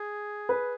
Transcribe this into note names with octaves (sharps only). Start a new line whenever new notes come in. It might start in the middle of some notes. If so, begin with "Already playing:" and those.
Already playing: G#4
B4